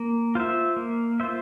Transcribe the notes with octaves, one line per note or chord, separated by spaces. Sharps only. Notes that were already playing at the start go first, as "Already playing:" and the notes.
Already playing: A#3
F4 C5 E5
A#3
F4 C5 E5